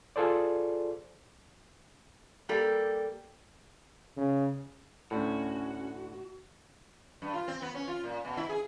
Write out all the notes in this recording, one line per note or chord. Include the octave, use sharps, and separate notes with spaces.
F4 G#4 A4 C5 D5
G3 A#3 G4 A4 D5
C#3
D2 A2 C#4 F#4
G2
F4
C4
B3
C#4
F4
A#2
B2
E4
G#4